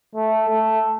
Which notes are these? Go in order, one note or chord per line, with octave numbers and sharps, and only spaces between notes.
A3
A3